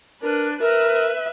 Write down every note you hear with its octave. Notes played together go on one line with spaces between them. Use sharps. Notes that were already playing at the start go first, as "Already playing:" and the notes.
D4 A#4 B4
A#4 B4 E5